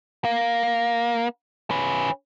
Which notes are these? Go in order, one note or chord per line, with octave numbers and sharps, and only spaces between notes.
A#3
C#4 B4